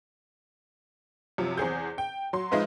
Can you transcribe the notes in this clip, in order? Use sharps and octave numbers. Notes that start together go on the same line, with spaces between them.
F#2 C3 F3
E2 C4 G#4 G6
G5
F#3 C6
F3 G#3 D#4 F4 B4 E5